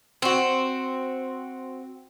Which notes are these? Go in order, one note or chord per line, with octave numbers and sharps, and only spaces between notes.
C4 F#4